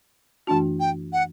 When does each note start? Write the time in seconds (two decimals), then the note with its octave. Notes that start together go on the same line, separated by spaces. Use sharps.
0.47 F#2 E3 A3 D4 F#4 A5
0.80 G5
1.13 F#5